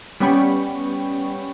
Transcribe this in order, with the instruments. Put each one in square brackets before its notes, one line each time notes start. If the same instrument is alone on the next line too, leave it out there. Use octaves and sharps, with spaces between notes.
[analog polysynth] G3 B3 C#4 G5 B5 C#6